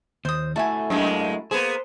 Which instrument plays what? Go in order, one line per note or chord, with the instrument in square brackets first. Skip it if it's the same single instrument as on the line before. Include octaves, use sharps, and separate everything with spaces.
[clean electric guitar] D#2 [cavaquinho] C5 D#6
[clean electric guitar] A3 E4 F#4 [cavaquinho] A4 E5 G#5
[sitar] F#2 G#3 A#3
[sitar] A#3 B3 G#4 [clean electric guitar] C5